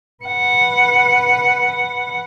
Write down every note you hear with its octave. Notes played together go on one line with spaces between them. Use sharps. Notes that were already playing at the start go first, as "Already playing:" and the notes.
B4 F#5